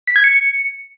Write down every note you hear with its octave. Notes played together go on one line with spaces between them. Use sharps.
B6
G#6
C#7